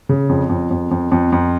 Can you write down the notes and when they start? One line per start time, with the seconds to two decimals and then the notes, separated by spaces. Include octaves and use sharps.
0.09 C#3
0.29 F2
0.49 F2
0.71 F2
0.91 F2
1.12 F2
1.32 F2